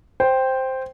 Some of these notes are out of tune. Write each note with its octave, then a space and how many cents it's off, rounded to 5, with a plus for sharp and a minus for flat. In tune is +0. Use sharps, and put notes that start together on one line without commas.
C5 +0 G5 +0